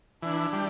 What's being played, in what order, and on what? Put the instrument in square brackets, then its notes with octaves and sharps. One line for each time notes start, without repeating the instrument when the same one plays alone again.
[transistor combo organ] E3 [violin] D4
[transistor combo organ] G3